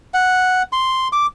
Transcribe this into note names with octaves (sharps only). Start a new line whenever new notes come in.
F#5
C6
D6